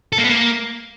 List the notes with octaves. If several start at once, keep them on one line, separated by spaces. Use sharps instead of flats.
A4
A#3
B3
A#3